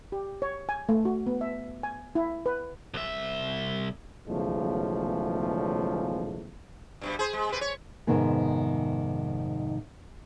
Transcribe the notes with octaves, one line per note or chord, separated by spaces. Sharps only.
G4
C#5
G#5
A3
F#4
B3
E5
G#5
E4
B4
C2 E5
B1 E2 C#3 F3 G#3 A3
G2 B2 G3
G#4 C5
G#3
C3 B4
C#5
F2 G#2 C3 D#3 B3 G#4